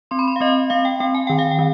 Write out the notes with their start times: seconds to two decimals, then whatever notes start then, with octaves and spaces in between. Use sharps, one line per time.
0.11 C4 C6
0.19 B5
0.28 C6
0.36 F5
0.41 C4 D#5
0.70 C4 F5
0.85 G5
1.00 C4 G5
1.15 G#5
1.27 D#3 G5
1.39 F5
1.51 G5
1.59 D#3